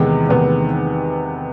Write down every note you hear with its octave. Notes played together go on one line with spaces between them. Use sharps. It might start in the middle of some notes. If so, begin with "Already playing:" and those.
Already playing: E2 C3 D#3 G#3 B3
E2 C3 D#3 G#3 B3